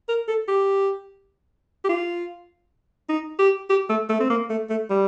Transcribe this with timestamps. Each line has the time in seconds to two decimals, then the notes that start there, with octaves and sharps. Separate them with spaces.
0.08 A#4
0.28 A4
0.48 G4
1.84 G4
1.89 F4
3.09 D#4
3.39 G4
3.70 G4
3.89 A3
4.09 A3
4.20 C4
4.30 A#3
4.50 A3
4.70 A3
4.90 G3